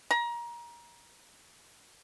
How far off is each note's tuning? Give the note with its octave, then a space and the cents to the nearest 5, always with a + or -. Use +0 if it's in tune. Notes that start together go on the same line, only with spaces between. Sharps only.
A#5 +25